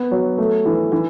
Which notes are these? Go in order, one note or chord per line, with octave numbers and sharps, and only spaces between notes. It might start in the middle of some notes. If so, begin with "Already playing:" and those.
Already playing: B3
F#3
A3
E3
E3